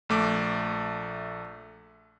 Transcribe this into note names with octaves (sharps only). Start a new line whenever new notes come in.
A#1 A3 D6